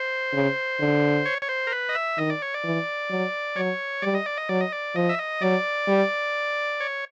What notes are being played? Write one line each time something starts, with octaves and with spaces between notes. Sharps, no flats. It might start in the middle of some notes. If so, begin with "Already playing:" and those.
Already playing: C5
C#3
D3
C#5
C#5
C5
A#4
B4
D#5
E5
D#3 D#5
D5
C#5
D5
E3
F#3
F#3 C#5
G3 D5
D#5
D5
D#5
F#3 D5
D#5
D5
F3 D#5
E5
D#5
F#3 D5
G3
C#5